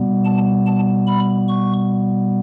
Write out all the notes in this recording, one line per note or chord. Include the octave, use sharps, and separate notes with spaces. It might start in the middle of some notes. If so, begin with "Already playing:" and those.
Already playing: B2 G3 B3
A5
A5
B5
C#6